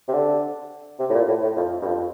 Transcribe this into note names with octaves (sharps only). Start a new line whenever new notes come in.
C3
D3
C3
A2
A#2
A2
A2
F2
G2
F2